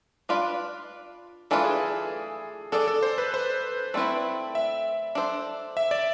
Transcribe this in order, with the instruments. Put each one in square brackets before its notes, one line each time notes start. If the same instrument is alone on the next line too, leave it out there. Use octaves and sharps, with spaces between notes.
[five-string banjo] D4 F4 B4 D5
[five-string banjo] E3 A3 D4 F4 B4 [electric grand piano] A4
[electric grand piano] G#4
G#4
[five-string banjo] D4 G#4 D5 [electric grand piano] A4
[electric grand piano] A4
C5
B4
C5
[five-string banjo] A3 C4 E4 B4 [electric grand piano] D5
[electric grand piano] E5
[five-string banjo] D4 A4 C5
[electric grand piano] E5
D5